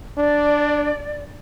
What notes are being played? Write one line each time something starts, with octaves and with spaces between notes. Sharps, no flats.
D4 D5